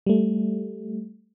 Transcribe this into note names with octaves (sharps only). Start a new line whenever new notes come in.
G3 A3